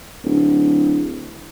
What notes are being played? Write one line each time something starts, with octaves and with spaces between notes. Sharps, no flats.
D1